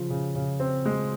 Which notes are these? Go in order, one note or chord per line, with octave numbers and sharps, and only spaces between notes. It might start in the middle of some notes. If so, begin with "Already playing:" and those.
Already playing: C#3 F3
C#3
C#3
C4
G#3